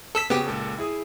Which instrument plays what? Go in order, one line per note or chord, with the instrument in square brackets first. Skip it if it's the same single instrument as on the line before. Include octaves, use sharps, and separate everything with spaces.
[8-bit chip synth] A4 E6 B6
[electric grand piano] C#3 F#4 [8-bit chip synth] B3 G4
[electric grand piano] C#2 A#2 A4
E4 G#4 D#6